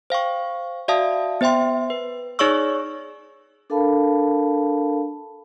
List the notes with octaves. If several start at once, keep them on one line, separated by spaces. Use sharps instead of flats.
C5 F5 G5 C#6
F#4 D5 E5 F5 A5 D#6
B3 C5 E5 G5 C6
B4
D#4 G#4 C#5 D5 C#6 E6
D4 A4 A#4 F5 A5 B5